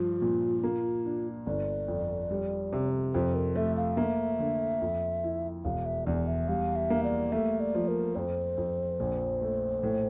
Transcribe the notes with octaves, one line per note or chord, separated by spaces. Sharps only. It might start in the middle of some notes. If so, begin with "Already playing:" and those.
Already playing: G2 F3 F4
A#2
A#3
D4
G1 D5
F2
G3
C3
F2 C5
A#4
A3 E5
F5
A#3 E5
D3
F2
E4
E1 F5
E5
E2 D5
E5
G3 F5
E5
A#3
D5
A3 E5
D5
F3
A#4
F2 C5 D5
F2
A#1
A3
A2